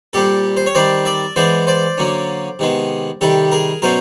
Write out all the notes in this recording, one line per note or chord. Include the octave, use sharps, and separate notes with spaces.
A#2 G3 C4 G4 A4
C5
C#5
D#3 G3 C4 C5 D5
D5 E5
E3 G#3 B3 C5 D5
C5 D5
D3 F#3 A#3 C#4
C3 D#3 G#3 B3
C3 D#3 G3 G4 A4
G#4 A#4
B2 F#3 A3 C#4 A#4 C5